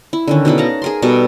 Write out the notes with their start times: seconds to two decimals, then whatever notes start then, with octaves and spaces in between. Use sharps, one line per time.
0.13 E4
0.27 D3 D#3 C#4
0.45 B2 D#4 E4 B5
0.58 F5 F#5 A5 A#5
0.82 G#4 A#4 C6
1.02 B2 G3 G4 A4